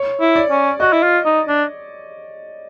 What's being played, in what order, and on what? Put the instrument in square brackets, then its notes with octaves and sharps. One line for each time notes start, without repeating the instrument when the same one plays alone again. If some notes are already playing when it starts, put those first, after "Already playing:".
Already playing: [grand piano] C#5
[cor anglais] E4
[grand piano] D5
[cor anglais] C#4
[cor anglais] F#4 [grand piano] D#5
[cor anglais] E4
F4
D#4
D4